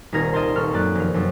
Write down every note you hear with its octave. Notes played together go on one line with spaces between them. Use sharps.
D#1 C2 D#4 A#4 G#6 A#6
D#5 F5 G5 A5 C6
D#1 A4 C#6 F6
F#2 A#3 D5 F#6 A6
F1 F5
F#2 C3 D4